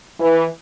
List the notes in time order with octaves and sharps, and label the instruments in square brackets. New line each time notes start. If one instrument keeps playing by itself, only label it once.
[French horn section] E3